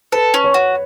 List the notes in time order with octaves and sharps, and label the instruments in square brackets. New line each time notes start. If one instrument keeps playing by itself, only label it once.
[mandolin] A4 [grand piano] B4
[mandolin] C#4
[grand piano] C#5
[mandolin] F#4